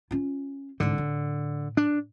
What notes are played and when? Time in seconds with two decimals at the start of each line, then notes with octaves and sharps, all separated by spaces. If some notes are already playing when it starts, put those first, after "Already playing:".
0.11 C#4 F4
0.80 C2 G#2 D3
0.98 A2
1.77 D4